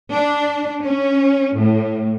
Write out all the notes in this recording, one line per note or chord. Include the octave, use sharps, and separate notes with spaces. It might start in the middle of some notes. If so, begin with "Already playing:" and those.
D4
C#4
A2